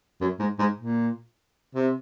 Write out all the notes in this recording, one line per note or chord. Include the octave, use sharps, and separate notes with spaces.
F#2
G#2
G#2
A#2
C3